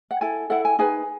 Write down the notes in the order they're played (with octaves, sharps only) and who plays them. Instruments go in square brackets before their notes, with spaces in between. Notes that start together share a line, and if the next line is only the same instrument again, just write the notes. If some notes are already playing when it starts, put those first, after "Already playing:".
[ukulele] F#5
E4 A4 G#5
E4 A4 F#5
G#5
D#4 G#4 B4 G#5